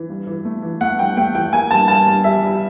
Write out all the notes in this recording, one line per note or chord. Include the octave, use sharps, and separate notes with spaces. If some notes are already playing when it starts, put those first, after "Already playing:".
Already playing: E3
G2
E3
A3
E3
A3 F#5
G2 G5
A3 G5
E3 G5
A#3 G#5
G2 A5
G2 A5
G2
G3 E5
G3